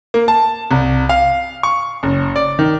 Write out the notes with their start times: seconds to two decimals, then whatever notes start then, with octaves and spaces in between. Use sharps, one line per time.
0.14 A#3
0.28 A5
0.71 C2
1.09 F5
1.63 C#6
2.03 F#1
2.36 D5
2.59 D#3